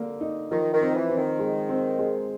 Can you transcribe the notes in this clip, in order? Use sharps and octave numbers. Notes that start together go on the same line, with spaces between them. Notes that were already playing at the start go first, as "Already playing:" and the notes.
Already playing: D3 A#3
D#4
D#3 F3
D#3
C4
E3
C4
D#3
G#3
C4
G#3